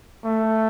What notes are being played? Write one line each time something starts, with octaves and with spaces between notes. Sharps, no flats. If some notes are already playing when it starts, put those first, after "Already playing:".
A3